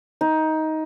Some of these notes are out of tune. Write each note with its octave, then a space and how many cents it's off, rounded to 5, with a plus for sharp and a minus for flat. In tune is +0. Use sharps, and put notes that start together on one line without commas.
D#4 +15